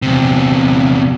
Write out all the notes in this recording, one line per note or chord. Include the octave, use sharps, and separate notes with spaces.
E2 C3